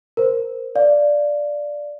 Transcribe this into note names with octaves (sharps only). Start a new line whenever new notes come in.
A#4 C5
D5 F5